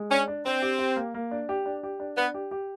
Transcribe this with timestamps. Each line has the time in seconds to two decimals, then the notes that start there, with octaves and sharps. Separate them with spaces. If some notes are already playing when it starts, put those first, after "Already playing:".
Already playing: G#3
0.10 C#4 D4
0.28 D4
0.45 C4 D4
0.62 G4
0.79 G4
0.96 A#3
1.14 A#3
1.31 D4
1.49 G4
1.66 D4
1.83 G4
2.00 D4
2.17 B3 D4
2.34 G4
2.51 G4